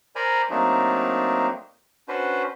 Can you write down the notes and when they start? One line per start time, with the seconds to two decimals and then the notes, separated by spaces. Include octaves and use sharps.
0.16 A#4 C5 D5 G#5 A#5 B5
0.50 F#3 A3 A#3 C4 D4 D#4
2.08 C#4 D4 F#4 B4 C5